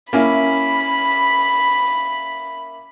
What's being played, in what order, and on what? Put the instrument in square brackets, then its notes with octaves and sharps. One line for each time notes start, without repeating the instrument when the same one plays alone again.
[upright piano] A#3 C#4 E4 [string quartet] B5